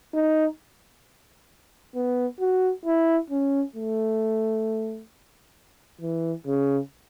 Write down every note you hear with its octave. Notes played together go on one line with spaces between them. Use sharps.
D#4
B3
F#4
E4
C#4
A3
E3
C#3